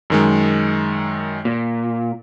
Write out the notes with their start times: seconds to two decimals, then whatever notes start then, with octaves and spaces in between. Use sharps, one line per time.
0.10 F#2 D#3 G#3
1.45 A#2